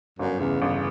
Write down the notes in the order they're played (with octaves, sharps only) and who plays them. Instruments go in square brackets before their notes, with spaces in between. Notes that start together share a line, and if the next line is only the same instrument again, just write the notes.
[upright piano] G1 [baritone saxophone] F#2
[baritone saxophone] E2 [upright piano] C#3
[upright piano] G1 [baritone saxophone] E2